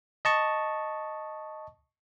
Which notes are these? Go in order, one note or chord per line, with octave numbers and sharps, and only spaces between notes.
D#5 A5 C#6